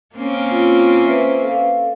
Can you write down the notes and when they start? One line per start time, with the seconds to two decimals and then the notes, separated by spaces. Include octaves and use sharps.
0.16 A#3 C4 C#4
0.51 F4
1.05 B4 C5 E5
1.42 A4 F5